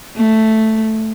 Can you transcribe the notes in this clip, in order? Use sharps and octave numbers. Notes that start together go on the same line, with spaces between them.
A3